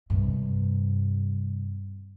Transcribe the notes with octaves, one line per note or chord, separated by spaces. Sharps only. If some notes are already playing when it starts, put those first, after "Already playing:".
G2 C3